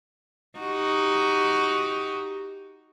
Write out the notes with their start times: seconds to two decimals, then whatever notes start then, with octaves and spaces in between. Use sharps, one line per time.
0.59 D#4 F#4 G4